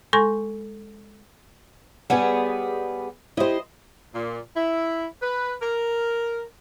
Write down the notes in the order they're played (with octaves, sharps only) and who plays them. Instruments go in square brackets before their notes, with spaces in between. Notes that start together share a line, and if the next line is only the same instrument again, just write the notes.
[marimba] G#3 A4 G#5 C6 C#6 A#6
[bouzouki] G3 B3 G#4 [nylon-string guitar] C#5 F#5
[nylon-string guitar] E4 G4 [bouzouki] C5 D#5
[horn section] A#2
E4
B4
A#4